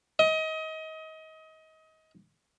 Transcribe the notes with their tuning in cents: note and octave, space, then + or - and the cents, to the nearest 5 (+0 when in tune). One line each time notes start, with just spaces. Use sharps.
D#5 +30